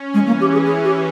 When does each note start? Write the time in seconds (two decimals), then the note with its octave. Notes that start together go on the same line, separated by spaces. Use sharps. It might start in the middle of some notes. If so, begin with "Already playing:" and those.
Already playing: C#4
0.13 E3 G#3
0.27 A#3
0.41 G4
0.53 G#4
0.66 G#4
0.84 G4